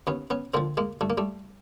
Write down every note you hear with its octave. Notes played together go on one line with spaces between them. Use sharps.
D#2 B3 C#4
B3 C#4
D3 F3 A#3 C4
G#3 A#3
G2 A3
A#3
G3 A3